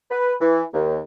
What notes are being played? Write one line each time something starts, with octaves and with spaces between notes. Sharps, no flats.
B4
E3
D#2